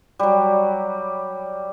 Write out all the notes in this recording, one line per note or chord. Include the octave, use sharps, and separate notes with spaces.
F#3 G3